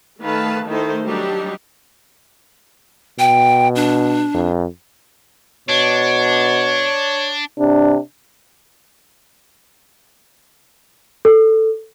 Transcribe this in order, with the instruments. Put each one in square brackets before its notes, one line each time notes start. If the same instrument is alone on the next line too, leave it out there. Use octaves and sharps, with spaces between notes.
[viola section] D#3 A3 B4 F5 A5
D#3 A3 D#4 E4 C5
F#3 G3 D4 D#4 G4
[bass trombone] B2 [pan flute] G5
[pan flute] D4
[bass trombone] F2
[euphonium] B2 [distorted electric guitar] D4 [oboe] C#5
[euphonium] C3 [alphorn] D4
[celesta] A4